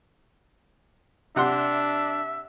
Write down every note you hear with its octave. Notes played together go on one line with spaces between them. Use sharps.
C3 D4 E5 F#5 C6